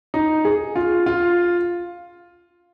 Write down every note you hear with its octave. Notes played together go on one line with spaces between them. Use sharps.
D#4
G#4
F4
F4